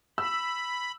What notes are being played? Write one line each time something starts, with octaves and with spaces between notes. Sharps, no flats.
B5 E6